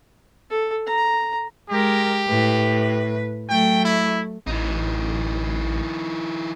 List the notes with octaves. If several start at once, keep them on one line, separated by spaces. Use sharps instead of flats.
A4
A#5
G#3 G4 A#4
A2 B4
F#3 A3 G5
E4
A1 E3 D#4